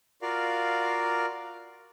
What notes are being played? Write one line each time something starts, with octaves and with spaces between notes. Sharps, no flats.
F4 F#4 A#4 D5 F5